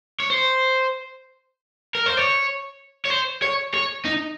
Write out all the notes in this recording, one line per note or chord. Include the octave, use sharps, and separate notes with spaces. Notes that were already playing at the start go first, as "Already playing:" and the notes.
C#5
C5
A#4
C5
C#5
C#5
C5
C#5
C#5
D#4